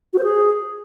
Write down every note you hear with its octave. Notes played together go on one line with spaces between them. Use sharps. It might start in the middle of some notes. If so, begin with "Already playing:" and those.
F#4
C5
G#4